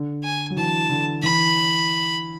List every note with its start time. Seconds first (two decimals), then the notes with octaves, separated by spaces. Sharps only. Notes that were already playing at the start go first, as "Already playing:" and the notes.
Already playing: D3
0.24 G#5
0.50 F#3
0.57 E3 A5
0.90 D3
1.23 E3 B5